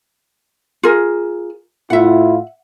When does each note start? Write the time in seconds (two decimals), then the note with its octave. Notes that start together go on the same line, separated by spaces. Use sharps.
0.83 F4 G#4 A#4
1.90 A2 E4 F4 E5 F#5